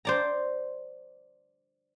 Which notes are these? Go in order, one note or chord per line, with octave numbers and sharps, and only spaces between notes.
C5 D5 A#5